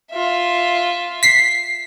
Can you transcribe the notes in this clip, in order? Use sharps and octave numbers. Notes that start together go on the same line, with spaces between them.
F4 E5
B6 C7